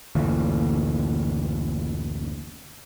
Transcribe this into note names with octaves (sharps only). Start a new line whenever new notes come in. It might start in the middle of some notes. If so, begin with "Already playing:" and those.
F#1 D2 A#2 E3